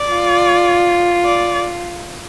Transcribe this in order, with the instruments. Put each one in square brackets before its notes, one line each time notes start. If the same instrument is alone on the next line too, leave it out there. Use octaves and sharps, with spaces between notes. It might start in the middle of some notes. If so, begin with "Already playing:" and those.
Already playing: [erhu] D5
[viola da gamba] F4
[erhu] D5